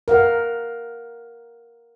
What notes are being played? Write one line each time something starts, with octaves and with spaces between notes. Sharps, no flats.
A#4 F5 F#5